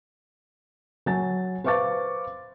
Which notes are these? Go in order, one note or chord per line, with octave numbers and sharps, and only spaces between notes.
F#3 G#5 A6
B4 C5 F5 C#6 D6 A6